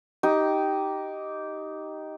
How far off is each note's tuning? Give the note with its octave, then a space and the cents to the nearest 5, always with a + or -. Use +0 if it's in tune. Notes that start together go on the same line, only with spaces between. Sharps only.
D#4 +5 G4 -10